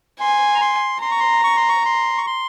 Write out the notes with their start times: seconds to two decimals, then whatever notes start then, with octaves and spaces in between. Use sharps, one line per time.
0.20 G#5 C6
0.55 A#5
0.61 C6
1.02 A#5 C6
1.11 C#6
1.20 C6
1.44 C#6
1.57 C6
1.69 C#6
1.85 C6
2.18 C#6
2.26 C6